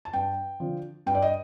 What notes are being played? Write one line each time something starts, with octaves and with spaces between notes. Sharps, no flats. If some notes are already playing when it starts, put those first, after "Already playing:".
A5
G2 G5
D3 F3
G2 G5
D5
D#5